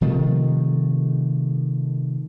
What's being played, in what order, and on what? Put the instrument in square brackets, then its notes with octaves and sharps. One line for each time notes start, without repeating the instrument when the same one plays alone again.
[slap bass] C3 D#3 F3 A3